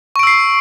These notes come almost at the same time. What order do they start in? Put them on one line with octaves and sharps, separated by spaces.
C#6 D7 E6 C7